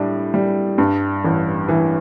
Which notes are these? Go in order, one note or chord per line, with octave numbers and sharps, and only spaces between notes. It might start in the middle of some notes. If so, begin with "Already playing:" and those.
Already playing: A2 G3 D4
G3
G2
A1
E3